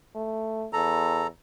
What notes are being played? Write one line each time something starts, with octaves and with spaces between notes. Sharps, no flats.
A3
E2 A4 A#5